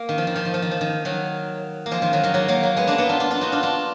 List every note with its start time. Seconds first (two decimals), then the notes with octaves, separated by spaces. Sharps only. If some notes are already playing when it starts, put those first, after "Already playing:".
Already playing: A#3
0.09 D#3
0.18 F3
0.27 D#3
0.36 F3
0.45 D#3
0.54 F3
0.62 D#3
0.71 F3
0.81 D#3
1.05 D#3 F#3
1.86 A#3
1.91 F3 G#3
2.02 D#3
2.13 D#3 F#3
2.24 D#3 F#3
2.34 F#3 A#3
2.48 F#3 A#3
2.63 F#3 A#3
2.77 G#3 B3
2.87 A#3 D4
2.98 B3 D#4
3.09 D4 F4
3.20 D4 F4
3.31 D4 F4
3.41 D#4 F#4
3.52 D4 F4
3.63 D4 F4